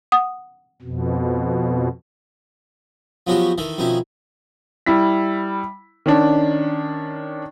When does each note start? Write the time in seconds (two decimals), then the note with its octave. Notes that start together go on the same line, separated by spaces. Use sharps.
0.12 F#5 D#6
0.82 F2 B2
3.27 F3 F#3 B3 C#4 F#4 G4
3.58 D#3 E3 A4
3.78 F2 B2 D#3 C#4 E4
4.86 G3 E4 B6
6.06 D#3 C#4 D4